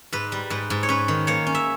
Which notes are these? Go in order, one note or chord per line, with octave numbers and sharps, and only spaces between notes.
G#2 B4
G3
G#2 B4
G#2
C#5
C#4 B4
D#3
A#3 C#5
C#4
E5